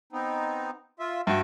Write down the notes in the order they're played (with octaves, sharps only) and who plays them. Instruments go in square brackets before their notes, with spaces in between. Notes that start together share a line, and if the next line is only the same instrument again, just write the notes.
[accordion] B3 C4 D#4
F4 E5
[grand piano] G2 F#4 [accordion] E5 G5